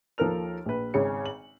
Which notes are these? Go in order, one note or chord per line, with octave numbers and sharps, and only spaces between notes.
D#2 F3 A4 A#4 F6 F7
A#1 B4
G#1 C#3 G#4 C#5 C#7
F#7